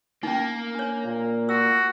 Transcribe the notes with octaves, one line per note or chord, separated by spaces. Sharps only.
A#3 C#4 D#4
D4 C#5
A#2
F#4 E6